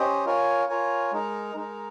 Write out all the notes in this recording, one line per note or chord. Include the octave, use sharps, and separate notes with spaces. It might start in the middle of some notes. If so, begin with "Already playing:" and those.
Already playing: C#4 G4 C5 D#5
F4 A#4 C#5 G#5
F4 A#4 C#5 G#5
G#3 D#4 A#4
G#3 D#4 A#4